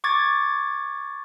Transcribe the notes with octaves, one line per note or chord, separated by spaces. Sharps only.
C#6 D6 G#6 A6